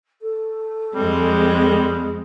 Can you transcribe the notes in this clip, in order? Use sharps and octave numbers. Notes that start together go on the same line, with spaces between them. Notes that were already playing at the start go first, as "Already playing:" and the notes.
A4
F2 G3 G#3 C4